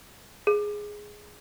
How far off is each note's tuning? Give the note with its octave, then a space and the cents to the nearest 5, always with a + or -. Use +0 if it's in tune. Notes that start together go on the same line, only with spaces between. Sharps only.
G#4 +0